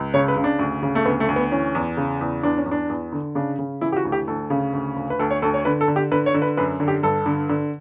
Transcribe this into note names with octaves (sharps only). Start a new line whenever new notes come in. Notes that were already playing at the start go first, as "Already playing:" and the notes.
Already playing: C#2
C#3 C#5
B4
C#3
D4
D2
C#3
A3
D2 B3
A3
D2
B3
E3 C#4
E2
C#3
E2
E2 D4
C#4
E2
D4
E2
D3
C#3 D4
C#3
E3 E4
G4
F#4
D2
G4
D2 A4
C#3
D2
D2
B4
D2 A4
C#5
D2 A4
C#5
D3 B4
A4
D3
G4
D3 B4
C#5
D3
B4
F#2 B4
D3
G4
G2 A4
D3
D3